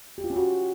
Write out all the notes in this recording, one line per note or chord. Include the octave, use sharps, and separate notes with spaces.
G4
F4
C#4
F#4